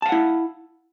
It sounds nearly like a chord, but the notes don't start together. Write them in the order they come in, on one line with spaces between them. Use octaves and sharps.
A5 F5 F#5 E4